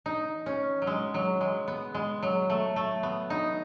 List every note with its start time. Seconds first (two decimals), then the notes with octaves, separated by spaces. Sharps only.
0.06 D#4
0.46 C#4
0.82 F#3
0.87 G#3
1.14 F#3
1.41 G#3
1.68 B3
1.95 G#3
2.22 F#3
2.50 A3
2.76 A3
3.03 B3
3.30 D#4